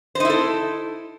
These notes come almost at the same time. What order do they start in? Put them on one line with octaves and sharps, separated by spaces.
C5 D#4 E4 A4